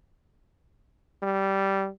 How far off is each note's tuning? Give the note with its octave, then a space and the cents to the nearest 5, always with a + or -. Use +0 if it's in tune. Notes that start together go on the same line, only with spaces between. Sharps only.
G3 -10